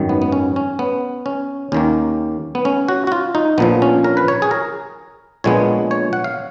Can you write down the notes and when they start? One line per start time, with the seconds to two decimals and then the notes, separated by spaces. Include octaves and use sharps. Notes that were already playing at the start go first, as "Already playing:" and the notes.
Already playing: G#1 F#2 D#3
0.09 B3
0.22 B3
0.32 C#4
0.56 C#4
0.79 B3
1.26 C#4
1.72 D#2 D#3 A#3 C#4
2.55 B3
2.65 C#4
2.88 F#4
3.07 F#4
3.12 F4
3.35 D#4
3.58 A#1 A#2 F3 B3
3.82 C#4
4.04 A#4
4.17 B4
4.28 C#5
4.42 G#4
4.51 A#4
5.44 A#1 A#2 G#3 B3 C#5
5.91 C#5
6.13 F#5
6.24 F5